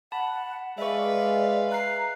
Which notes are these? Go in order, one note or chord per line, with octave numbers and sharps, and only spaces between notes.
F#5 A5 B5
G#3 B4 D5 E5 F5 C#6
A#5 F#6 C7